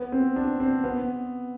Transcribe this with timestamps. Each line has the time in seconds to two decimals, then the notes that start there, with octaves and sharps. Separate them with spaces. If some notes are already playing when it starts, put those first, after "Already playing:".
Already playing: B3
0.12 C4
0.36 D4
0.60 C4
0.84 B3